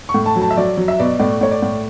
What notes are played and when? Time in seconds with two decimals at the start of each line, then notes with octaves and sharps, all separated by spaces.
0.09 C#6
0.14 A2
0.26 A5
0.36 F#3
0.41 A5
0.51 E5
0.57 F#3 D5
0.77 F#3
0.88 E5
0.99 B2 D5
1.20 A2 D5
1.41 A2 C#5
1.51 D5
1.62 A2